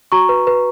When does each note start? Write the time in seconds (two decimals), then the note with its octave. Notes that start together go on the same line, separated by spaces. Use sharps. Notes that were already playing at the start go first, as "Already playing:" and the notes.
0.12 F#4 A#5 C#6
0.29 B4
0.47 B4